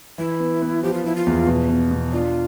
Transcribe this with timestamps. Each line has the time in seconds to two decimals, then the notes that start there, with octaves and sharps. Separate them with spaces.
0.18 E3 E4
0.40 B3
0.62 B3
0.83 F3 G4
0.94 F4
1.04 F3 E4
1.15 F4
1.27 E2
1.47 B2
1.68 B2
1.91 B2
2.12 D4 F4